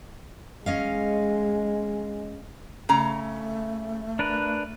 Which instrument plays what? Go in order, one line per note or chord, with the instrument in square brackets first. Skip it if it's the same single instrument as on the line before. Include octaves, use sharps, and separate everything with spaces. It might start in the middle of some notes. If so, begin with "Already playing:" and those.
[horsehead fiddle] G#3 [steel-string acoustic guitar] C#4 D#5 F5
[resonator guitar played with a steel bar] C#3 A#5 [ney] A3
[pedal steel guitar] D4 A#4 B4